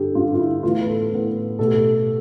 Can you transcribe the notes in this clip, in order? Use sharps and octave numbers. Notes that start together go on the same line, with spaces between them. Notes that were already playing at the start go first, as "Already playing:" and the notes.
Already playing: G2 D3 G3 G4 A4
G2 D3 G3 F4
F4
E4
A2 E3 B3 F4
B4
A4
A2 E3 B3
B2 A3 A4
G4
A4